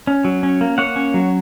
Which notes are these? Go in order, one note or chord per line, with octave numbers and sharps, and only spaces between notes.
C#4
F#3
C#4
A#3
A#3 C#5 F#5
C#4
F#3